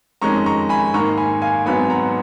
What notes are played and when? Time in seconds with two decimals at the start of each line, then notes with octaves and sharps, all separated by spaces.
0.22 F2 D#3 G#3 C#4 A#5 C#6
0.46 A#5 C#6
0.69 G#5 B5
0.94 G#2 D#3 A#3 A#5 C#6
1.17 G#5 B5
1.42 F5 G#5
1.66 G#1 G#2 F#3 B3 G#5 B5
1.90 F#5 A#5